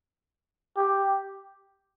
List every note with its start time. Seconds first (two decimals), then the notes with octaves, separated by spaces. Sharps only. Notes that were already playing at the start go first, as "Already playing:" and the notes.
0.77 G4